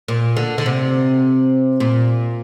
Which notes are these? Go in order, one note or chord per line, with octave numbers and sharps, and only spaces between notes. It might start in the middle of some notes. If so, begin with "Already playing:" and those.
A#2
D3
D3
C3
A#2